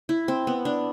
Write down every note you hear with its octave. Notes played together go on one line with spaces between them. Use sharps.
E4
C4
B3
D4